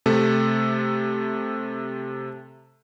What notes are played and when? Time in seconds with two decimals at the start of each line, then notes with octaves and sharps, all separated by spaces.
0.06 C3 A3 A4